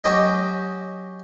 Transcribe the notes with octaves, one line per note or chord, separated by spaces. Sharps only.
F#3 C#4 G4 D#5